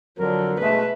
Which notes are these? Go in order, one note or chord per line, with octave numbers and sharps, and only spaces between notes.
F2 D3 F#3 A#4
B2 G#3 A3 B4 E5